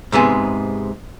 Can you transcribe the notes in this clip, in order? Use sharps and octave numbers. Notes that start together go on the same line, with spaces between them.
G#2 C3 B3 G#4